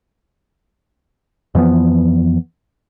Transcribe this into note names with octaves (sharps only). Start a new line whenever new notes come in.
F2 E3 F3 B3